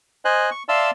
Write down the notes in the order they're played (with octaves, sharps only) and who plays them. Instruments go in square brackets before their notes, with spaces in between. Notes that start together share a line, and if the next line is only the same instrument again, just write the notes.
[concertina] C5 D#5 G#5 F#6
C#6
D5 E5 F5 A5 C6 E6